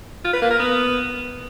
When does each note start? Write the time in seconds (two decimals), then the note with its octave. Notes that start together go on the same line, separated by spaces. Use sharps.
0.25 F4
0.33 B4
0.42 A#3
0.51 A#4
0.59 B3